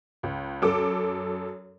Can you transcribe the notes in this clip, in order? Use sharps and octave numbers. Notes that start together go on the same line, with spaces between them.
C#2
F#2 A4 D6